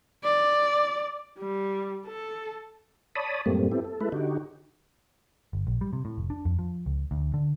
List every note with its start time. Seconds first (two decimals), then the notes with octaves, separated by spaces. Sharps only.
0.24 D5
1.38 G3
2.06 A4
3.15 C#5 D5 A5 B5 D#6
3.46 F#2 A2 G3 A3 A#3 C4
3.71 B3 C4 E4 G4 A4
3.84 A4
4.01 G#3 A3 E4 A4 B4
4.12 D3 D#4 F#4 G4
5.53 G1
5.67 A#1
5.81 G3
5.93 C3
6.05 A2
6.18 F1
6.30 D4
6.45 F2
6.59 F3
6.86 C#2
7.11 D2
7.34 D3